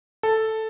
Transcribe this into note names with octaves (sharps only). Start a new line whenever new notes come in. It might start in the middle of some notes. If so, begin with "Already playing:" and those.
A4